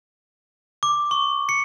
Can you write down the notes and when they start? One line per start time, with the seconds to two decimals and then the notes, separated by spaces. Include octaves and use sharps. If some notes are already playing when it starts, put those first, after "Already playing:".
0.83 D6
1.11 C#6
1.49 C#7